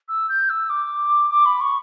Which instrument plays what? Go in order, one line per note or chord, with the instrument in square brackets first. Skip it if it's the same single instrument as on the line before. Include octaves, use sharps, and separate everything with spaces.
[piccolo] E6
G6
E6
D6
D6
B5
C#6